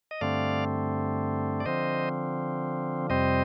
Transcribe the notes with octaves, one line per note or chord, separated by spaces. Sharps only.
D#5
G2 D3 A3 C4 D5 F5
D5
D3 F3 C4 C5 D#5
F2 C3 G3 C4 C5 D#5